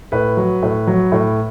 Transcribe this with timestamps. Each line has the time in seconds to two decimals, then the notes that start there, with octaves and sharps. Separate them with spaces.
0.12 A2 B4
0.37 F#3
0.62 A2
0.87 F#3
1.12 A2